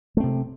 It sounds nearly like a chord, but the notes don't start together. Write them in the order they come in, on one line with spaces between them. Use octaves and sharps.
A3 C4 C3